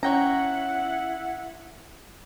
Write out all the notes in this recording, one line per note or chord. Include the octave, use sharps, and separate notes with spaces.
C#4 E4 C#5 F#5 G5 A#5